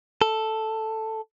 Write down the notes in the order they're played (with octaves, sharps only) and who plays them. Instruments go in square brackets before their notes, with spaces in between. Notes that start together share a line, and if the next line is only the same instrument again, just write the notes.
[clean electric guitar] A4